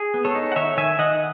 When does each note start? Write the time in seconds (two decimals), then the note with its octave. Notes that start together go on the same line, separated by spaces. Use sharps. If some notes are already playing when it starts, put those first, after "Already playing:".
Already playing: G#4
0.14 B3
0.25 A4 C#5
0.35 D#4
0.52 F#5
0.56 D#3 C#5 E5
0.77 D#3 E5 G#5
0.99 D#3 D#5 F#5